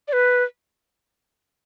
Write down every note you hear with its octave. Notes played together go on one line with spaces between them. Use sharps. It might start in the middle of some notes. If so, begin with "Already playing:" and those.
D5
B4